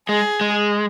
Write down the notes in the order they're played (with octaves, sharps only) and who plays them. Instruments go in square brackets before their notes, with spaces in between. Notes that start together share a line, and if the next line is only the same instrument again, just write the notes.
[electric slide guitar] G#3 [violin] G#4
[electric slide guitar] G#3